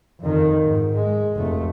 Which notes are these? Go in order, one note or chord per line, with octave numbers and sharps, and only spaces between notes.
F2 D#3
G#2
G#3
F1 A3